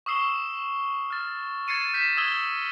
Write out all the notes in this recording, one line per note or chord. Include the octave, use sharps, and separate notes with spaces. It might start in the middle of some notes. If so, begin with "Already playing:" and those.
C#6 D#6 E6 C7 E7 G7
F6 A6
G#6 A6 C7 C#7 D#7 E7
G6 A6 B6 D#7 E7
D#6 E6 G#6 G7